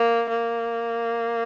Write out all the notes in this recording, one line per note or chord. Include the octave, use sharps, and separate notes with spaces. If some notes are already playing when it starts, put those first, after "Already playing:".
Already playing: A#3
A#3